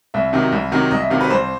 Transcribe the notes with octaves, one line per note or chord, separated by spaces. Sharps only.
C2 E5
C3 D#3 F#3
C2
C3 D#3 F#3
C2 D#5
E5
C3 D#3 F#3 F5
B4
C2 C5